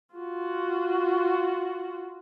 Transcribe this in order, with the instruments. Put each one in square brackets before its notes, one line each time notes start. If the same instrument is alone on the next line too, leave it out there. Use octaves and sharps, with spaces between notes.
[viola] F4 F#4